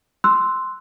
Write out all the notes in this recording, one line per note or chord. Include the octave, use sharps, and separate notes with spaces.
C6 E6 F#6